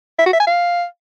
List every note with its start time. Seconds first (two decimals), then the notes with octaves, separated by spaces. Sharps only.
0.19 E5
0.26 F#4
0.33 E5
0.40 G#5
0.47 F5